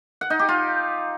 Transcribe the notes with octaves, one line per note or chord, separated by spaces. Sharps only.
F#5
D#4
G4
F4